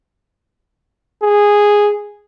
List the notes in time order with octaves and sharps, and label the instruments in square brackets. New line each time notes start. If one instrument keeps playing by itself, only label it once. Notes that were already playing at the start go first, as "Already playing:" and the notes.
[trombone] G#4